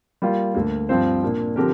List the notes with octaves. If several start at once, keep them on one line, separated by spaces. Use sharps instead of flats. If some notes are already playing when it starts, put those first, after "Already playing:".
G3 A#3 F4
D2 D3 A#3
G2 F3 C4 F4 C5
A#2 A#3 D4
D3 F3 C4 G4 A#4